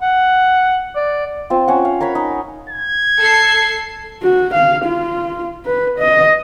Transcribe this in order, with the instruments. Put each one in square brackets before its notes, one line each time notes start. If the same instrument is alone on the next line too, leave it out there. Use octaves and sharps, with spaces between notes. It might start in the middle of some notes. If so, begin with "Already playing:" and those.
[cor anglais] F#5
D5
[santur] C4 F4
C#4 F#5
F5
A#4 C#5 F#5 B5
D#4
[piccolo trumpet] G#6
[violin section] A4 C7
[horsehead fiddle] F#4
F5
F4
B4
D#5